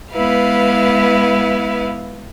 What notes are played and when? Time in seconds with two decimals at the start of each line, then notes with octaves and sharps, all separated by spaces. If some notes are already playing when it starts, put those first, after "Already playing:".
0.14 G#3 B3 E4 B4 F5